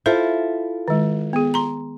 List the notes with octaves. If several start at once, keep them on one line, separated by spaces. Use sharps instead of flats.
E4 F4 A4 C5
D#3 G#3
B3 G#4
A#5 C6